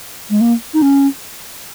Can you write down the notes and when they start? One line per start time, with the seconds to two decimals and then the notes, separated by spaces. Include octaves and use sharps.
0.30 G#3
0.41 A#3
0.74 D#4
0.82 C#4